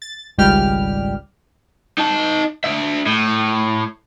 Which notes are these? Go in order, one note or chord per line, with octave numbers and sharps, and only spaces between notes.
A6
G#1 C#2 G3 G4 F6
D#4 A5
D4 E5
A2